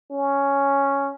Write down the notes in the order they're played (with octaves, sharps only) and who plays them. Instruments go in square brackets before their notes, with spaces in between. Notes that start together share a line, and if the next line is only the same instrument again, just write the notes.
[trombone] C#4